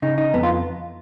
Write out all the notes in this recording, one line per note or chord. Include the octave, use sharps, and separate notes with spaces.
C#3 D#4
D#4
F2 B3
F4